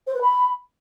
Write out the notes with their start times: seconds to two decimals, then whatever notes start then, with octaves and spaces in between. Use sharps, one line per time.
0.07 C5
0.14 B4
0.21 B5